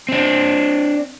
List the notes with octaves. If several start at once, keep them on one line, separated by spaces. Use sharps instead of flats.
C4 D4